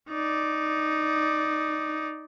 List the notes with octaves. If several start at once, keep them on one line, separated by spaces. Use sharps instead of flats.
D#4 D5